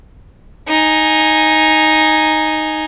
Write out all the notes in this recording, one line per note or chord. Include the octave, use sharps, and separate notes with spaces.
D#4 G#5